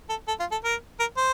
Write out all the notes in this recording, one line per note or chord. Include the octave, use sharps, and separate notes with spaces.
A4
A4
F4
A4
A#4
A#4
C5